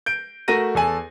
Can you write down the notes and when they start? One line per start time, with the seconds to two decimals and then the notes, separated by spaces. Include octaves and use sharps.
0.06 G6 D7
0.48 A3 F#4 A#4 A#6 D#7
0.75 E2 A4 G#5 F#7